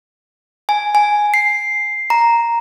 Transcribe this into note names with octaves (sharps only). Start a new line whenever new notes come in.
G#5
G#5
C7
A#5